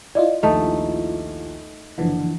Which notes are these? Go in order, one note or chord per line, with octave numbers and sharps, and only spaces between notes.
E4 F4 D5 D#5
A#1 D#2 A3 D#4 D#5
F#1 D3 E3 F3